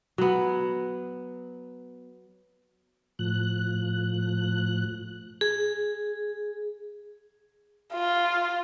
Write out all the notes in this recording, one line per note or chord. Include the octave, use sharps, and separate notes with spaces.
F#3 B3
A2 F3 F#6
G#4
F4